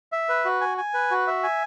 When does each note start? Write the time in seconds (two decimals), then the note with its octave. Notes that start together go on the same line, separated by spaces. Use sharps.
0.12 E5
0.29 B4
0.45 F#4
0.61 G#5
0.78 G#5
0.94 B4
1.11 F#4
1.27 E5
1.43 G#5